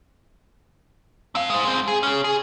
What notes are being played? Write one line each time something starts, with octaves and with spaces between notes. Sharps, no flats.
C4 F5
G#3 C5
G#3 C4
G#4
C#4 G#4
G#4